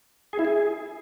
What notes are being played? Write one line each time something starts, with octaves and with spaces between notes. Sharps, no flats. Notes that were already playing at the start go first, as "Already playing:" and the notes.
G#4
E4
G#4